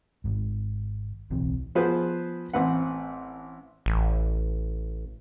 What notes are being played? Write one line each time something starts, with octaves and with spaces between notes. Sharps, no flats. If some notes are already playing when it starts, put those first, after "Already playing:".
G#1 G#2
D1 B1 E3 C4
F3 B3 G#4 B4 C5
A1 C4 B4 F#5
A1